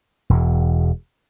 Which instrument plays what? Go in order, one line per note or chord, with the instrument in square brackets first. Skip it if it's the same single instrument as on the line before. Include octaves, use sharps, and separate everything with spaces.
[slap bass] E1 E2